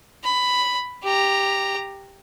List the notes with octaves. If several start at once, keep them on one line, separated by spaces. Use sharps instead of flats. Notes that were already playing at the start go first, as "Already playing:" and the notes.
B5
G4 A#5